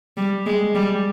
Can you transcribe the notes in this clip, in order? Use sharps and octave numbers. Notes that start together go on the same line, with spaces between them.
G3
G#3
G3